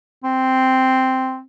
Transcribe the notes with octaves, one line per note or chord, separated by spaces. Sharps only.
C4